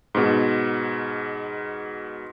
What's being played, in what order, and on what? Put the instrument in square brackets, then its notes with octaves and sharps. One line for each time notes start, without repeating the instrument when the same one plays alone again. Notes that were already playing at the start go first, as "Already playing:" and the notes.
[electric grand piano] G#2 B2